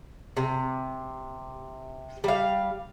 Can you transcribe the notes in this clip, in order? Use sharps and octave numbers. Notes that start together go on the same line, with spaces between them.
C3
G3 F5